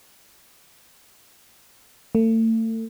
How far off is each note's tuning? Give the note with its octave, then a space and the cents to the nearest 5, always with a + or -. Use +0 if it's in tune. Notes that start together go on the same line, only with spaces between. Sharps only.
A3 +35